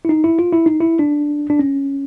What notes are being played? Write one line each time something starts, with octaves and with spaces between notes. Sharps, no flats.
E4
D#4
E4
F4
E4
D#4
E4
D4
D4
C#4